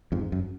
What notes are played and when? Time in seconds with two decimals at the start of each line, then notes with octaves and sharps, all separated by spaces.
0.12 F2 G#2
0.32 F#2